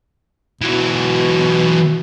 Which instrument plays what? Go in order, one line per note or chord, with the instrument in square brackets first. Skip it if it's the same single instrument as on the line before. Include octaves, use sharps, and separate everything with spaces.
[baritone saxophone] B2 [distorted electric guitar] E3 F#3